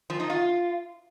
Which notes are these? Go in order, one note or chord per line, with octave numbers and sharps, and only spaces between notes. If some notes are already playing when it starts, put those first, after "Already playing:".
F3
D#4
F4